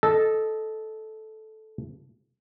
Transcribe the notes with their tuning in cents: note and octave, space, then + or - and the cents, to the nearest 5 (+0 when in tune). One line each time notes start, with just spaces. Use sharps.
A4 -10 D#5 +0